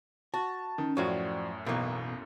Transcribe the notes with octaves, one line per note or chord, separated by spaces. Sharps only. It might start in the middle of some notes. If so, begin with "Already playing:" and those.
F#4 A5
D#3 C#4
F#2 A2 F3 F#4 C#5 D5 G5 C#6
B1 B2 E3 A#3 B3